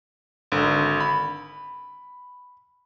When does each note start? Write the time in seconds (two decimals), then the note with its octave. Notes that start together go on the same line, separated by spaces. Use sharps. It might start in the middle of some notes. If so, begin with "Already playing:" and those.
0.52 G#1 D3
1.00 B5